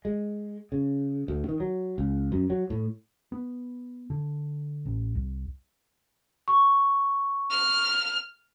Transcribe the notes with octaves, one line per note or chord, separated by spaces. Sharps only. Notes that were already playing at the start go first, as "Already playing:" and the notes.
G#3
C#3
D2
D#3
F#3
C#2
F#2
F#3
A2
B3
D3
A1
C2
C#6
F6